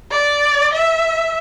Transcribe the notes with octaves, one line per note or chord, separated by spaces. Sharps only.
D5
E5